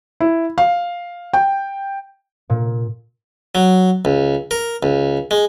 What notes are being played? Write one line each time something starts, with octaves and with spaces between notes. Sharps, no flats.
E4
F5
G5
A#2
F#3
C#2
A#4
C#2
G#3